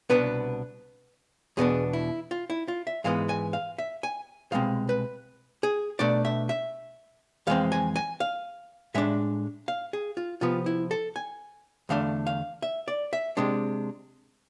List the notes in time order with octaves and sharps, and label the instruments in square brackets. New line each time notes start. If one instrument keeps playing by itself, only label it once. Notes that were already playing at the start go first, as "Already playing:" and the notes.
[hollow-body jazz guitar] C2 B2 B3 D4 B4
E2 B2 B3 D4 G#4
E4
F4
E4
F4
E5
G#2 E3 G#3 B3 F5
G#5
F5
E5
G#5
C2 B2 G#3 C4 F5
B4
G#4
B2 A3 D4 D5
E5
E5
F2 E3 G#3 C4 F5
G#5
G#5
F5
A2 G#3 D4 E5
F5
G#4
F4
C3 F3 B3 F4
E4
A4
G#5
E2 D3 A3 D4 F5
F5
E5
D5
E5
C3 G#3 D4